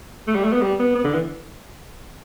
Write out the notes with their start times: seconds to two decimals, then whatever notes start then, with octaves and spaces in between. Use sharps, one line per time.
0.27 A3
0.36 G3
0.44 A3
0.53 B3
0.62 G3
0.79 B3
0.95 B3
1.05 D3
1.14 E3